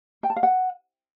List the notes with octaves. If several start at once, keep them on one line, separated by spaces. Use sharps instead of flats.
G5
A5
F5
F#5